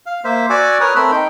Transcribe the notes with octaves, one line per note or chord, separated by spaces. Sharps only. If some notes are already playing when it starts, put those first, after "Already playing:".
F5
A#3 C5 E5
F#4 D5 F#5 G#5 D6 E6
A#4 B4 C#5 D#6 F6
A3 C4 A#4 B5 E6
D#4 G5